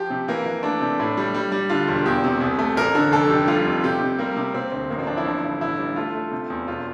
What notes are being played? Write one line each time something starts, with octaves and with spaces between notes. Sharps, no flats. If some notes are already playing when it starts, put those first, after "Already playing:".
Already playing: F3 G4
C3
E3 A#3
E3
A3 D4
C3
A2
G3
G3
G3
D3 F4
E1
E2 G4
C3
C2
A3
A1 A#4
D3
F1 A4
F1 G4
G3 F4
F2
C3 G4
C3
G3 A#3
C3
C3 C4
D2
A1 A#3
C4
F3 D4
E4
G1
G2
A1 E4
G3
A3 F4
A3
C3
E2
E1 F4